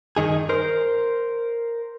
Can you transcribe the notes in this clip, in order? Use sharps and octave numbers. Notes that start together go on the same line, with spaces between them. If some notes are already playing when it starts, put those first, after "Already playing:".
G2 D#3 D#4 G#4
A#4 C5